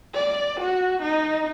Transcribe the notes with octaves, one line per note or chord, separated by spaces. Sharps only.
D5
F#4
D#4